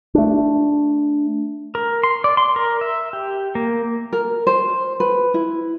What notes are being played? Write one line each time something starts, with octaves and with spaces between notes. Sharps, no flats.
A3 D4
A#4
C6
D5
C6
A#4
E5
G4
A#3
A#4
C5
B4
E4